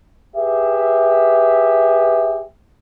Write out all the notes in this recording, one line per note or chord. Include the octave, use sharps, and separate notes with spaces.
G4 G#4 B4 E5